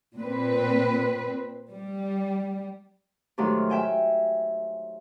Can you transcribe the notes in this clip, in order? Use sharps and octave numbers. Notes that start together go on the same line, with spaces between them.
A#2 C4 B4
G3
G#2 D#3 F3 F#3 A3 G4
E5 G5 G#5